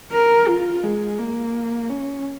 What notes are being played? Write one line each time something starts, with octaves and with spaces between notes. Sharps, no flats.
A#4
F4
G#3
A#3
C#4